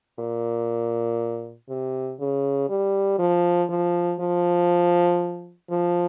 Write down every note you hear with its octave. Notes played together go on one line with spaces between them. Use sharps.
A#2
C3
C#3
G3
F3
F3
F3
F3